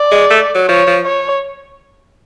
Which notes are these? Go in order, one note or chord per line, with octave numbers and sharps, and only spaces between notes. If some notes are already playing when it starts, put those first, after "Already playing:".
Already playing: D5
G#3
A3
F#3
F3 C#5
F3
C#5